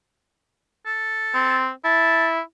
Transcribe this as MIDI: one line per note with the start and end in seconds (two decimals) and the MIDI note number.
0.86 1.59 69
1.34 1.70 60
1.84 2.40 64
1.84 2.26 81